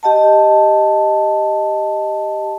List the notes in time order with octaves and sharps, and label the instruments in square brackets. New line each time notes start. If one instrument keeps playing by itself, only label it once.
[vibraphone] G4 D#5 F#5 A5